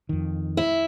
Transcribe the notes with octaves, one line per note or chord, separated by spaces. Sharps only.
F2 D#3
E4